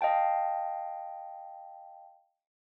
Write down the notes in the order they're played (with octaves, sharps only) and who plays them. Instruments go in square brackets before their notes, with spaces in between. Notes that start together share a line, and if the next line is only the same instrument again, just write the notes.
[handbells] D#5 F5 G5 A5